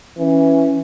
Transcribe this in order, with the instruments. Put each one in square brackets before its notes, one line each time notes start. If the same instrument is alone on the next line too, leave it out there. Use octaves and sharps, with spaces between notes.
[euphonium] E3 [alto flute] C#4